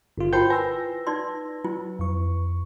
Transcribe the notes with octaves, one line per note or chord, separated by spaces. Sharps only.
G1 F4
E4 F4 A#4 C5 G5 A5 C6 G6
B4 G#5 E6 A#6
D#4 D5 C6
F#3 E4
F2 C#6